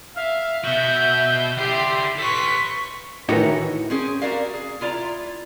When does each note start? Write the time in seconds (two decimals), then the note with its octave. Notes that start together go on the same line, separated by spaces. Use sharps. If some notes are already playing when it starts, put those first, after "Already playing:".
0.15 E5 F5
0.64 B2 F#4 E5 G6
1.57 D3 E4 G4 C6 C7
2.19 A4 B4 C6 C#6 B6
3.29 A2 D#3 E3 D#4 F#4 C#5
3.90 C4 C#4 G#4
4.22 F#4 G4 A#4 D5 F5
4.54 G#4
4.81 E4 F4 D5 A#5